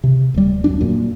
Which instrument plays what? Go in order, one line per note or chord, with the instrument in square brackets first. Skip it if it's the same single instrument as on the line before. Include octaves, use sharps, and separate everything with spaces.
[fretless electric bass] C3
D1 G3
D#1 F#2 D4
F#2 A#2